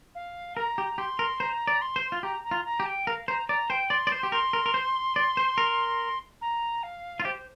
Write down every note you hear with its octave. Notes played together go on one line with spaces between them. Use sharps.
F5
A#4 A#5
G4
G4 C6
A#4
C5 A#5
D5
C6
C5
F4
G4 A#5
A#5
F4
A#5
G4
G5
A#4 F5
C5 A#5
D5 A#5
C5 G5
D5 C6
D5
C5
G4
A#4 C6
A#4
A#4
C5
D5
C5
A#4
A#5
F5
F4
G4 C5